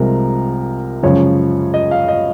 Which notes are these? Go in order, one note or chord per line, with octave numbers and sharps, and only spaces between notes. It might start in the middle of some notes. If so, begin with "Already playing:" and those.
Already playing: C2 C3 F3 G#3 A#4
F#2 C#3 F3 G#3 C#5
D#5
F5
D#5